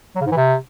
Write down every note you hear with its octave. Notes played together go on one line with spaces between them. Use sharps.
F#3
C#3
G#2
E3
C3